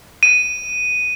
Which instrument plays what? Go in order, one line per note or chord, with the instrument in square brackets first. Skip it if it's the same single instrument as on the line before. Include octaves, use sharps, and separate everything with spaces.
[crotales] D#7